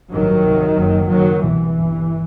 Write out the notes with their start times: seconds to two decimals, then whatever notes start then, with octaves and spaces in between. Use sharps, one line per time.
0.11 A1 G2 D#3 F#3
0.45 C2 C3
0.77 F#1 F#2
1.10 F#1 F#2 D#3 F#3
1.43 C2 B2 E3
1.76 G1 G2